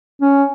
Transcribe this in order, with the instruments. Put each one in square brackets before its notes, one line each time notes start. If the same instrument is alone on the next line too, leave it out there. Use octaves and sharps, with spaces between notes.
[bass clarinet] C#4